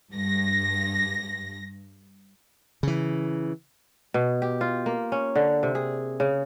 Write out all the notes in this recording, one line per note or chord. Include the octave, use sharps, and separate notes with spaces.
G2 A#6
C#3 E3
B2
G4
F4
A#3
C#4
D3
C3
G#4
C#3